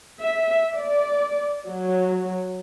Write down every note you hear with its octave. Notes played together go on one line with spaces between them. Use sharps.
E5
D5
F#3